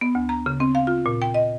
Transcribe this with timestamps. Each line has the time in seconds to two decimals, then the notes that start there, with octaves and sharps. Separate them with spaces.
0.01 B3
0.15 D2
0.29 A#5
0.46 C#3
0.60 C4
0.75 F5
0.87 F4
1.06 A#2
1.22 G5
1.34 D#5